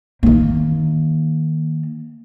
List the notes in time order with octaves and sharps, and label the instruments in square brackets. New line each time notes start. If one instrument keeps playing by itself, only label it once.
[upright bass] D#3 A#3